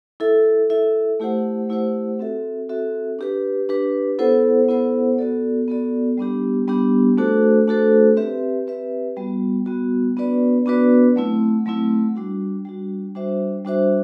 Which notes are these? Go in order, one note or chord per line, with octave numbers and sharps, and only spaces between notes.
E4 A4 E5
E4 A4 E5
A3 E4 G4 C5 F#5
A3 E4 G4 C5 F#5
C4 F#4 A4 E5
C4 F#4 A4 E5
D4 G4 B4
D4 G4 B4
B3 E4 A4 C5 F#5
B3 E4 A4 C5 F#5
B3 F#4 A4 D5
B3 F#4 A4 D5
G3 B3 D4 G4
G3 B3 D4 G4
A3 D4 F#4 A4 C5
A3 D4 F#4 A4 C5
C4 G4 B4 E5
C4 G4 B4 E5
G3 B3 F#4
G3 B3 F#4
B3 D4 F#4 B4 D5
B3 D4 F#4 B4 D5
F#3 A3 C4 E4
F#3 A3 C4 E4
G3 D4 F#4
G3 D4 F#4
G3 D4 F#4 C5 E5
G3 D4 F#4 C5 E5